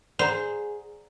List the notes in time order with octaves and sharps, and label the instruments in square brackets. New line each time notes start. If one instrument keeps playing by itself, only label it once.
[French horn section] G#4 [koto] C5 [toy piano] D5 F#5 A#5